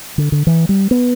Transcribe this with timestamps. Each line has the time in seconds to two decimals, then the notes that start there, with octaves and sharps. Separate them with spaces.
0.18 D3
0.32 D3
0.47 E3
0.69 G3
0.91 B3